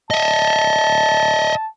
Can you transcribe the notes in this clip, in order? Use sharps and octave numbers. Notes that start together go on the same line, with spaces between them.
D#5 E5 A5